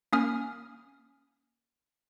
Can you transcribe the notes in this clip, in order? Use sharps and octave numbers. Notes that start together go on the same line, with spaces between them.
A#3 C#4 D#6 F6